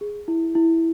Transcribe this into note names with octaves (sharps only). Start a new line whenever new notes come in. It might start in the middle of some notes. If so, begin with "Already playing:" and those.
G#4
E4
E4